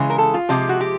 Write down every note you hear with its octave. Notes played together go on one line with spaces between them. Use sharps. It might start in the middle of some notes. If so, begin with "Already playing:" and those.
Already playing: C#3 E3 G#3
A#4
A4
F4
C3 F3 G#3 G4
F#4
G4